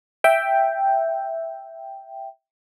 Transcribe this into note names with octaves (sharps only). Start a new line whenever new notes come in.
E5 G5